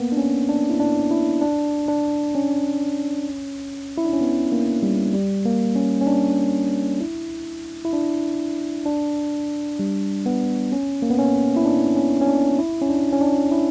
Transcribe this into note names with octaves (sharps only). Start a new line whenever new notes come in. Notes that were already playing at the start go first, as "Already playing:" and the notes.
Already playing: A#3 B3
D4
C#4
D4
E4
D4
E4
D4
D4
C#4
E4
D4
C#4
B3
A#3
G3
G3
A#3
C#4
C#4
D4
E4
E4
D4
D4
G3
B3
C#4
A#3
B3
C#4
E4
D4
C#4
C#4
D4
E4
C#4
D4
C#4
D4
E4